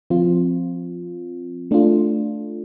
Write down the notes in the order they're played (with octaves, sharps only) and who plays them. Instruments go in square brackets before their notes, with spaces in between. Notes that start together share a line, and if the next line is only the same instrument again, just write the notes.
[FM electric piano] F3 C4 F4
A3 D4 F4